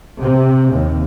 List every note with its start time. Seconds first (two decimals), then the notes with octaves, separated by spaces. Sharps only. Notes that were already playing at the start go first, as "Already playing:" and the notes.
0.22 C3
0.73 D#2